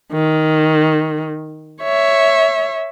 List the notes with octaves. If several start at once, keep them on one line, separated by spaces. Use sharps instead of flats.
D#3
C#5 E5